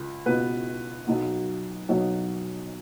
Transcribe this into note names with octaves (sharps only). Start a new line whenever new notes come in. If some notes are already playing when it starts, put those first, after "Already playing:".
Already playing: C#2
C#2 B2 B3 B4
B1 B2 F#3 B3
B1 B2 F#3 B3 C#5